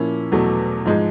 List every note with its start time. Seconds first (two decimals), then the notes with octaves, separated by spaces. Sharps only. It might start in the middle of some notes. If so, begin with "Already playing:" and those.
Already playing: A#2 F3 A#3 C#4 E4
0.32 E2 B2 F#3 A3
0.85 G#2 F3 G#3